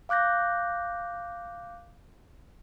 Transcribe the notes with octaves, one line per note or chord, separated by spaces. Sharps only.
F5 D6 F#6 G6 A#6